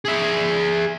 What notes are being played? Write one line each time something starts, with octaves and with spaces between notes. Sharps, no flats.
G#4 E5